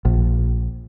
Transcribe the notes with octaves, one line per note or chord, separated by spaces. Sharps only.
A#1